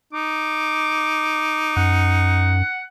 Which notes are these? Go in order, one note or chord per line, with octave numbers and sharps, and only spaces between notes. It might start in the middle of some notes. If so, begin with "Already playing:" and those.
D#4 D6
F#2 F#5